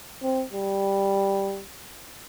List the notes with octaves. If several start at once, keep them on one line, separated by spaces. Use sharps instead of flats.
C4
G3